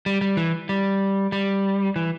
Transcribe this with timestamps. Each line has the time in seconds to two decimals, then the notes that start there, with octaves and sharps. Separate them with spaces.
0.06 G3
0.21 G3
0.37 E3
0.69 G3
1.32 G3
1.96 E3